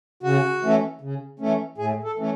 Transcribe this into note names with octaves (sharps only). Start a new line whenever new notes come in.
C#3 F#4
E3 A3 C#4
C#3
E3 A3 C#4
A2 G#4
A4
E3 A3 C#4